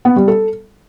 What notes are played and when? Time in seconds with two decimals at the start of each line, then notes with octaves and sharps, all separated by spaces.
0.05 B3
0.16 G3
0.28 A4